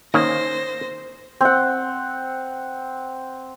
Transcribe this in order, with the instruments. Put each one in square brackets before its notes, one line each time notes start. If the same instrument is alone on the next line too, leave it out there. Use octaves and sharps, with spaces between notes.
[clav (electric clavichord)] D#3 A#3 C#4 [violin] C5 A#6
[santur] C4 F#5